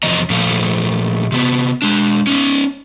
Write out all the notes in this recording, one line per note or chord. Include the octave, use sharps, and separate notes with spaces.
E2 C3 F3 C#5 D#5 A#5
A#2 F3 A3 F5
C3 B3
G#3 D4
C#4 D#4